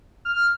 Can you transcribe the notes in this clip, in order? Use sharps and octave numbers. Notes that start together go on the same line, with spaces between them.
F6